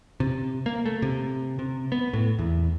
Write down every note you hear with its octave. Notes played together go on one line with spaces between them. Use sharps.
C3
A#3
A3
C3
C3
B3
A2
E2